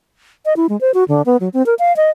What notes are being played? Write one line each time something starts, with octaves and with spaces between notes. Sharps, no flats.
D#5
E4
G#3
C5
F#4
D3
B3
F#3
C4
A#4
F5
D#5